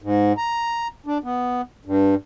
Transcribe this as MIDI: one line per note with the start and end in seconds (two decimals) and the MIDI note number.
0.02 0.33 44
0.38 0.87 82
1.06 1.18 62
1.24 1.61 59
1.85 2.15 43